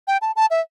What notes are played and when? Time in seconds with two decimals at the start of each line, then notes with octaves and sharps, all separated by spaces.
0.07 G5
0.21 A5
0.36 A5
0.50 E5